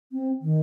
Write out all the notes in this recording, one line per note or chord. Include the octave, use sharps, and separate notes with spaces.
C4
D#3